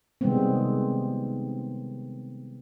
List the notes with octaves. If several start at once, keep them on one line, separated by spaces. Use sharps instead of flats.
C3 D#3 G3 G#3 B3 C4